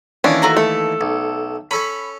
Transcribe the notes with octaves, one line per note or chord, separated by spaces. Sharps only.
D#2 E3 C#4 D4
A3 F#4 A#5
A3 A4
B1
C#4 A4 C#5 B5